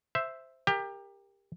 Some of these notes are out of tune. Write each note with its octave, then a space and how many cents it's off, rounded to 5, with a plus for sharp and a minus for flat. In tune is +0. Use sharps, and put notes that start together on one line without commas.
C5 +0 E5 +0
G4 +20 A#4 +0